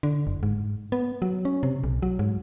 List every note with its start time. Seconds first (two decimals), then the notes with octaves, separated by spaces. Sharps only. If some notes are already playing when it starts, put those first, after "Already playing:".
0.03 D3
0.27 F#1
0.43 G#2
0.92 B3
1.22 F#3
1.45 C#4
1.63 C3
1.84 B1
2.03 F#3
2.19 G#2